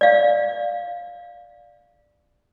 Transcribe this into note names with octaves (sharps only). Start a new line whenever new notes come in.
D5 F5